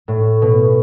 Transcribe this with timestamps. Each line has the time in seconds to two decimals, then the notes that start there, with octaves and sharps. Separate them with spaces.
0.08 A2
0.42 B2